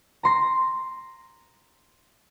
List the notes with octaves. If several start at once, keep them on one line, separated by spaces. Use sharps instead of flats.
A#5 C6 A#6